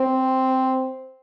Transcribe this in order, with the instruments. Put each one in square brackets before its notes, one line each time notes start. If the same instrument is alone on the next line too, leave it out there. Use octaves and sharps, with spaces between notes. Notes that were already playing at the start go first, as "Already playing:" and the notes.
Already playing: [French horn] C4